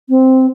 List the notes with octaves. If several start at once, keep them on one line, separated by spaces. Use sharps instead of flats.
C4